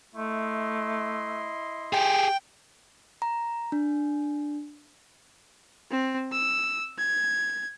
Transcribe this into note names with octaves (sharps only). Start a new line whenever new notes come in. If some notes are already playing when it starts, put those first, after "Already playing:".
A3 E4 D#5 C6
G4 G#4 G5
A#5
D4
C4
E6
G#6